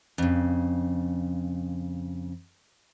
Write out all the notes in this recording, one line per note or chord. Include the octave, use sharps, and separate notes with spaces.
F2 C#3